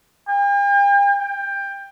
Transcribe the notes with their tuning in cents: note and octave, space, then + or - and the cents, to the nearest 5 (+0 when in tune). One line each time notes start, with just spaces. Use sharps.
G5 +45
G5 +20